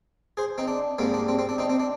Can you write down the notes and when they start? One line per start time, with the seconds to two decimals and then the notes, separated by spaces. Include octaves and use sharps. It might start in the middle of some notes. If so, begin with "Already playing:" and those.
0.37 G#4 C5
0.58 C4 D#4
0.68 D4
0.98 G#2 G3 A#3 C4
1.14 D4
1.28 C4
1.39 C4
1.49 D4
1.58 C4 D#4
1.70 C4
1.80 D4